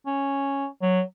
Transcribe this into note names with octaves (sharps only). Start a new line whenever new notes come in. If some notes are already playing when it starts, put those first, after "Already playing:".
C#4
F#3